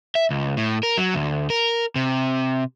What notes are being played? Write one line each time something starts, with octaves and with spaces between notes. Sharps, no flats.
E5
C#2
A2
A#4
F#3
D2
A#4
C3